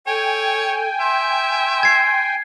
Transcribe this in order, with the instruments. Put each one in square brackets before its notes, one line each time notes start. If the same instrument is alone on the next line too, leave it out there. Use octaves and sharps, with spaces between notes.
[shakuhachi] A4 [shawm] C#5 [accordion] G5 G#5
[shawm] E5 [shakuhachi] C6
[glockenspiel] G#6 C7